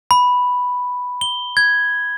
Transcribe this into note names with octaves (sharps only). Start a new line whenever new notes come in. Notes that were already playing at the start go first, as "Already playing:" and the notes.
B5
G7
G#6